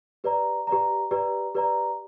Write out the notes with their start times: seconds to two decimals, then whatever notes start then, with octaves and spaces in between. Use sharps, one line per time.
0.24 G4 B4 D5 A#5
0.67 G4 B4 D5 A#5
1.11 G4 B4 D5 A#5
1.55 G4 B4 D5 A#5